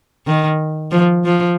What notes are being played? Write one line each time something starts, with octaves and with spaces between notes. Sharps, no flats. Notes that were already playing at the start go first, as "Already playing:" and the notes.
D#3
F3
F3